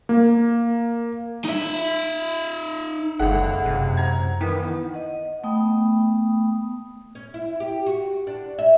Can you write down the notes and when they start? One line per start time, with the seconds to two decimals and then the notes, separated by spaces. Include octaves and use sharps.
0.09 A#3
1.45 D#4 E5
3.19 F#1 C#2 G#4 A4 E5 F#5
3.66 F#2 C3
3.97 A#5 G#6
4.41 D#3 E3 B3
4.94 D#5 F#5
5.44 A3 B3 G5 B5 D#6
7.15 C#4
7.34 E4
7.60 G4
7.86 F#4
8.27 D4
8.58 E5